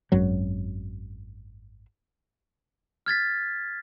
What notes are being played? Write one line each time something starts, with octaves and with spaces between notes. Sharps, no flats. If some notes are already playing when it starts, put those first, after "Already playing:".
G#1 F#2 F#3
F6 G#6 A6 B6